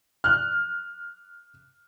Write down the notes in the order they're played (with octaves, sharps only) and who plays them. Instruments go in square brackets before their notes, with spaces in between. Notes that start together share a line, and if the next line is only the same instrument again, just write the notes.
[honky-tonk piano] F6 F#6